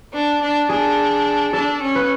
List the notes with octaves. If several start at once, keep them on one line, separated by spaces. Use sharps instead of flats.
D4
D4
D4 G#4
D4 A4
C#4
B4